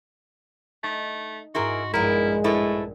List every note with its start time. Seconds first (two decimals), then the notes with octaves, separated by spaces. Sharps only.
0.83 A3 D#4
1.55 G#2 E4 F#4 G#4 A#4 C6
1.94 A#1 G2 G#3 B3 E4 A#4 C#6
2.44 A2 E4 A4 B4